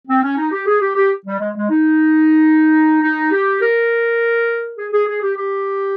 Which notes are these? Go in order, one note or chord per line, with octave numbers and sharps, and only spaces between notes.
C4
C#4
D#4
G4
G#4
G4
G4
G3
G#3
G#3
D#4
D#4
G4
A#4
G#4
G#4
G#4
G4
G4